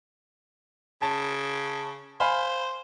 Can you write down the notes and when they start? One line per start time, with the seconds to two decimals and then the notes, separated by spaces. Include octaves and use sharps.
1.02 C#3 A5
2.20 C5 F5 G#5 B5